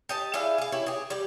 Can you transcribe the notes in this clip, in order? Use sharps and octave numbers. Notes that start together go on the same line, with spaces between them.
G4 D#5 A5
E4 G#4 D5 F5
G#4 F5
E4 G4 C#5
G4 G#4
G3 G4